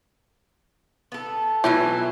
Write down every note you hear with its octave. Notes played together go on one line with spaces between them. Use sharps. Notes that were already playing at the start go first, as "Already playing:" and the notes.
B3 A4
B2 E3 F#3 E4 F4